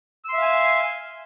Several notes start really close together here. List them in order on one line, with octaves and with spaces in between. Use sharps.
E6 C6 E5 F5 G#5